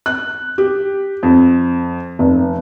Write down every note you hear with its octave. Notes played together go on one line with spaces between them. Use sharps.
F#6
G4
F2
F1